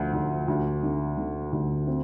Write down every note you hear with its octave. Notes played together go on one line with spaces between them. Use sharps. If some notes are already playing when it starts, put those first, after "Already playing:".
Already playing: D2 F3
D2
D2
D3
D3
D2
C4